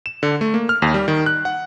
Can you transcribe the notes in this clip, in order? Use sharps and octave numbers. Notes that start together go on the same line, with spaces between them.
E7
D3
A3
A#3
F6
D#2
G3
D#3
F#6
F#5